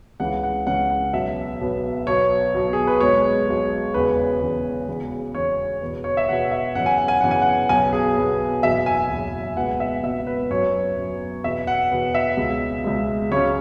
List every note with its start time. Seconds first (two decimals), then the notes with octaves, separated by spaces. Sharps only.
0.20 C#2 C#3 E3 C#4 F#5
0.43 F#5
0.66 C#2 C#3 E3 C#4 F#5
0.90 F#5
1.13 B1 B2 B3 E5
1.61 B1 B2 B3
2.07 B1 B2 B3 C#5
2.54 B1 B2 B3
2.73 G#4
2.87 B4
3.01 B1 B2 G#3 C#5
3.47 B1 B2 G#3
3.94 E1 E2 C#3 B4
4.41 E1 E2 C#3
4.88 E1 E2 C#3
5.35 E1 E2 C#3 C#5
5.81 E2 B2 B3
6.04 C#5
6.17 E5
6.29 E2 B2 B3 F#5
6.51 E5
6.75 F#2 C#3 E3 B3 F#5
6.86 G#5
6.98 F#5
7.08 G#5
7.21 F#2 C#3 E3 B3 F#5
7.31 G#5
7.42 F#5
7.69 B1 B2 B3 G#5
7.93 G#4
8.16 B1 B2 B3
8.63 F#1 E2 B2 E5
8.86 G#5
9.10 F#1 E2 B2
9.57 C#2 B2 B3 F#5
9.80 E5
10.03 C#2 B2 B3 E5
10.27 B4
10.50 F#2 F#3 B3 C#5
10.97 F#2 F#3 B3
11.44 E2 B2 B3 E5
11.67 F#5
11.91 E2 B2 B3
12.14 E5
12.37 C#2 B2 G#3
12.84 C#2 B2 G#3
13.32 C#2 C#3 F#3 C#4 C#5